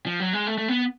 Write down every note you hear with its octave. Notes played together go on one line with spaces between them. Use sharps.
F3
F#3
G#3
A3
A3
B3